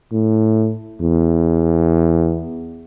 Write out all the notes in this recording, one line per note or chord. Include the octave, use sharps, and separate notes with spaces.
A2
E2